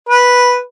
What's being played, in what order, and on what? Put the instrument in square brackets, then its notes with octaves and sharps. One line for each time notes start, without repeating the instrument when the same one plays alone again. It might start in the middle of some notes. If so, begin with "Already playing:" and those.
[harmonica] B4